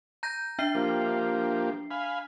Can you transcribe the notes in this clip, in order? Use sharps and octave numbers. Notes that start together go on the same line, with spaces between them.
A#5 G6 A#6
D4 E5 C7
F3 A#3 G4
F5 G#5 B5